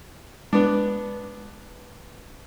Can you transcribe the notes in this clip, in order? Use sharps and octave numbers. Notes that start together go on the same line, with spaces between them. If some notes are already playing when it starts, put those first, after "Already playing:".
G#3 B3 D4